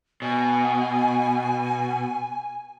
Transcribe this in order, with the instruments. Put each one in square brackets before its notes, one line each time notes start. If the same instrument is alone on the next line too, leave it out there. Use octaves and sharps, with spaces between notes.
[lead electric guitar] B2 [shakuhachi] G#5